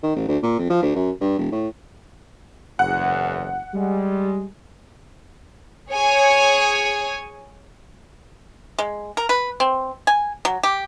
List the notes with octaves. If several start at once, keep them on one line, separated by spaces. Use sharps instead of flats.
D#3
A1
D2
A#2
F2
F3
D2
F#2
G2
E1
A2
F#1 E2 F#5
G3 G#3
G#4 C#5 G#5
G#3
A#4
B4
C4
G#5
F#3
G4